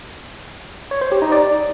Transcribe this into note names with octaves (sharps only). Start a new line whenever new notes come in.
C#5
C5
G4
D#4
D5